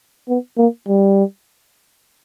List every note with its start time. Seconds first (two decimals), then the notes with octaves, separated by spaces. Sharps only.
0.29 B3
0.58 A#3
0.88 G3